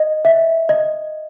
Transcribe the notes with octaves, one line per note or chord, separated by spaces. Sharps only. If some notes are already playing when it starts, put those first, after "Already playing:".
Already playing: D#5
E5
D#5